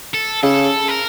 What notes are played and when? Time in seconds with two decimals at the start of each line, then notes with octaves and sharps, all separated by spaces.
0.14 A4
0.43 C#3 A4
0.88 A#4